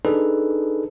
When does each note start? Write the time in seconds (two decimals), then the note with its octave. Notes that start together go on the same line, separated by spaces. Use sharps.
0.05 D4 D#4 G#4 A4 B4